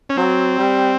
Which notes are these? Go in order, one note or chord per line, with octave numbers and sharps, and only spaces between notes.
C#4
F#3 C4
G3